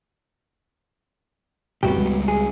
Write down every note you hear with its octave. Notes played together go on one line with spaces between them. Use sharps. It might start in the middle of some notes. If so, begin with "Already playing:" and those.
D2 G2 C3 B3 F#4 G4
C#2 G3 G#3
G#4